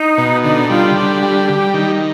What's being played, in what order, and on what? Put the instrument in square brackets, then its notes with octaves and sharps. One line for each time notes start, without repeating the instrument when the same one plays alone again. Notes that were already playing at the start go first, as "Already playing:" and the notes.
Already playing: [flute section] D#4
[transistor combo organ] B2
[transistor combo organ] D3 [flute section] D#4
[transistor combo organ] G3 [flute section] F4
[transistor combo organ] D3 [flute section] G4
[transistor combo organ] G3
G3
D#3